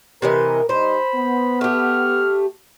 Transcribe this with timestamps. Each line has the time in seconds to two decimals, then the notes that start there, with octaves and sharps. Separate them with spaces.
0.22 C3 E3 A#4 D#5
0.69 G3 D#4 C5 B5
1.15 B3
1.61 A3 G4 F6